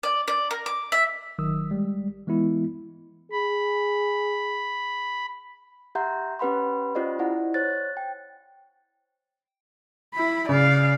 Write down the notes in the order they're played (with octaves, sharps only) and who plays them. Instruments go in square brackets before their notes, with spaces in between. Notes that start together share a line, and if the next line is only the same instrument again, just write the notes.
[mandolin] D5
D5
A#4
D6
E5
[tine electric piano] G1 D#3 F#3 D#6 E6
G3 G#3
E3 G#3 B3 E4
[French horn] G#4 [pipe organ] B5
[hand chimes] G4 E5 F#5 A#5 C6 G6
C#4 G4 B4 F#5 B5 C6
C#4 F4 G4 C5 D5 D#5
E4 D5 F#5
C5 C#5 F#6 A6
G5
[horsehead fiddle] E4 B5
[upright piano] C#3 [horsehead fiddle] D5 F5